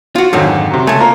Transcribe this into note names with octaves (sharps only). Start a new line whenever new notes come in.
F4 F#4
F2 G#2 D3 D#3 F#3
C3 F#3
C#2 A3 G#5 A5
A#3 F4 A#4